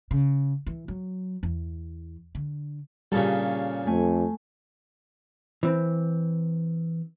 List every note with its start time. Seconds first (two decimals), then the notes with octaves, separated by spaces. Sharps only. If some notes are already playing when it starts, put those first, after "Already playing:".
0.11 C#3
0.66 E3
0.88 F#3
1.43 E2
2.35 D3
3.12 A#2 C#3 G3 A4
3.87 F2 A3 G#5
5.63 E3 C4